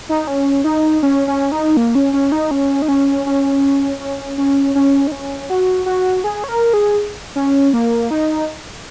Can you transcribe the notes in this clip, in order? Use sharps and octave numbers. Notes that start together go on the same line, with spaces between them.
D#4
C#4
D#4
C#4
C#4
D#4
A#3
C#4
C#4
D#4
C#4
D#4
C#4
C#4
C#4
C#4
C#4
D#4
C#4
F#4
F#4
G#4
C#5
A#4
G#4
C#4
A#3
D#4